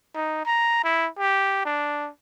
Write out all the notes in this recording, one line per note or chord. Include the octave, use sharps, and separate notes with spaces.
D#4
A#5
E4
G4
D4